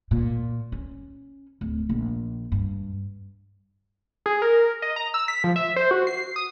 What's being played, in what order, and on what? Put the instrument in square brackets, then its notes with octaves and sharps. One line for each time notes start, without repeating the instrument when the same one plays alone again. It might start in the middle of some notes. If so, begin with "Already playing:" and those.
[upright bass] A#2
C#4
D1
A#1
G2
[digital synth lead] G#4
A#4
D#5
A#5
E6
B6
F3
E5
C5
F#4
C7
D#6